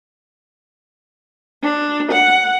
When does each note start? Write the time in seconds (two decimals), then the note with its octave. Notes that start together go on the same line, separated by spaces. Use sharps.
1.63 D4
2.11 F#5